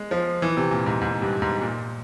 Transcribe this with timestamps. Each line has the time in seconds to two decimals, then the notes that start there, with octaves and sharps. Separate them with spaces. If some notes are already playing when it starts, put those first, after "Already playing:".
Already playing: G#3
0.11 F3
0.42 E3
0.57 C3
0.71 A#2
0.86 G#2
1.02 G#2
1.22 G2
1.42 G#2
1.62 A#2